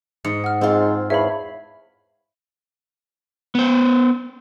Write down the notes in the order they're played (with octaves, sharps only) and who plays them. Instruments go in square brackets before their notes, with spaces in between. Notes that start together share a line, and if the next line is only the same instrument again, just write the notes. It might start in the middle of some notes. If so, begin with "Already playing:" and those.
[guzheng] G#2 [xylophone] C#7
[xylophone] F#5 F6
[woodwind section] G#2 [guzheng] C4 F4
[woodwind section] E2 C#5 [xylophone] E5 F5 B5
[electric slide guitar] B3 C5